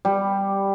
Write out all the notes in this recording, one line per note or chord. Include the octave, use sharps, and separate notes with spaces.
G3